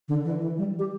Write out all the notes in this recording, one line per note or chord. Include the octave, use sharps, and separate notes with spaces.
D3
E3
E3
G3
G4